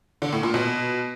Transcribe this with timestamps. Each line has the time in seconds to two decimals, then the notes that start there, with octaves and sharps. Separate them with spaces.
0.22 D3
0.33 A2
0.43 A#2
0.54 B2